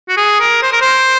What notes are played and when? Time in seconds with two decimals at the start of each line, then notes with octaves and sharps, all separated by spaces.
0.09 F#4
0.17 G#4
0.40 A#4
0.63 C5
0.72 A#4
0.81 C5